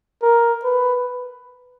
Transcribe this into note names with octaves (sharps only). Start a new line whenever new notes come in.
A#4
B4